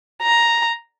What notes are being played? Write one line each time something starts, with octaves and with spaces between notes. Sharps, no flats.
A#5